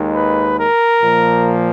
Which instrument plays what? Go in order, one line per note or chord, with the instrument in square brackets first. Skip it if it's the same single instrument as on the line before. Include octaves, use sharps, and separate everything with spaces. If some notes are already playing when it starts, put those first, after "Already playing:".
Already playing: [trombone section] D#2 D#3 G#3
B4
A#4
A#2 F3 A#3